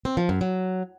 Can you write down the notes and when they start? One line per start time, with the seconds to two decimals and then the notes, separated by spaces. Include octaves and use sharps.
0.05 C4
0.17 F3
0.29 F#2
0.41 F#3